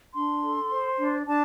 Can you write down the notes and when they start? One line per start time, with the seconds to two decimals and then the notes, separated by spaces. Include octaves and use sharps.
0.14 D4 C6
0.42 A4
0.70 C5
0.99 D4
1.26 D4 A5